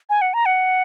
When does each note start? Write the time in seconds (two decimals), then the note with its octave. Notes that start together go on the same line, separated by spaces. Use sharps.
0.10 G#5
0.21 F#5
0.34 A#5
0.46 F#5